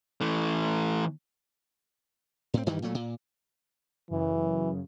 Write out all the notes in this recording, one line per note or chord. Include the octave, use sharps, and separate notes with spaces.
E3 A3
A2 C4
G2 D#3 E3 G3
A#2 F#3 A3
A#2
F#2 C#3 E3